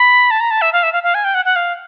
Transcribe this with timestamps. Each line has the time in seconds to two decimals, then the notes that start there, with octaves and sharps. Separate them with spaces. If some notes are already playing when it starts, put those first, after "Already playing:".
Already playing: B5
0.31 A5
0.40 A#5
0.51 A5
0.62 E5
0.73 F5
0.83 E5
0.93 F5
1.03 F5
1.15 G#5
1.24 G5
1.35 F#5
1.45 F#5
1.56 F5